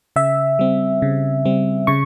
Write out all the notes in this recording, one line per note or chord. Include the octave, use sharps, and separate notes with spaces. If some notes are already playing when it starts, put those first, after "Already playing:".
C#3 E5
G3 C4
C#3
G3 C4
C#3 C#6